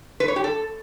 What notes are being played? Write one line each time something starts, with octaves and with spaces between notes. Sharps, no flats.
B4
C#5
G4
A4